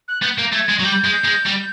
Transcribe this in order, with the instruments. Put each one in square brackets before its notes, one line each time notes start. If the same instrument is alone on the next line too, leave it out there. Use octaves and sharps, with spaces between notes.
[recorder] F#6
[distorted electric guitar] B3 [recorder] G6
[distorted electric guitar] A#3
[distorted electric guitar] A3 [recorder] G#6
[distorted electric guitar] G#3
F#3
[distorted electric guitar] G3 [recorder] G6
[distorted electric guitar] G#3
G#3
G3